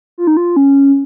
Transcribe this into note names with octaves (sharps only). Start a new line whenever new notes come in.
F4
D#4
F4
C#4